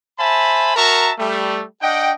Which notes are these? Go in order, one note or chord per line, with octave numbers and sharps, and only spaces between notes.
C5 E5 G#5 A5 B5
F#4 A#4 E5 A5 A#5 C#6
G3 A3
D4 D#5 F#5 G5